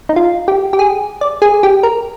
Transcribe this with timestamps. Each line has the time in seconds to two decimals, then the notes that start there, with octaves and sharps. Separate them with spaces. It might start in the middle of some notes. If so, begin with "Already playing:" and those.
0.09 D#4
0.16 F4
0.48 G4
0.73 G4
0.79 G#4
1.21 D5
1.42 G#4
1.63 G4
1.83 A#4